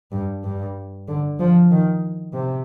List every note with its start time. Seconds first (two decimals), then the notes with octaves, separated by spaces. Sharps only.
0.12 G2
0.44 G2
1.08 D3
1.39 F3
1.71 D#3
2.34 C3